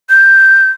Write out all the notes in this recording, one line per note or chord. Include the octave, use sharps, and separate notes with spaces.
G6